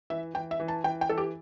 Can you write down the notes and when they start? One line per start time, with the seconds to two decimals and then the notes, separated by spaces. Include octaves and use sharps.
0.10 E3 E5
0.34 E3 G5
0.51 E5
0.60 E3
0.68 A5
0.84 E3 G5
1.01 G5
1.09 E3 A4
1.18 G4